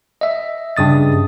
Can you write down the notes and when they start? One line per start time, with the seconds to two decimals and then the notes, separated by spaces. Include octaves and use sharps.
0.21 D#5 E5
0.77 G2 C#3 D#6 A6